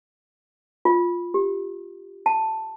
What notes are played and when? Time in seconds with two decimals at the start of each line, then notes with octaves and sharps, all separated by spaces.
0.85 F4
1.34 G4
2.26 A5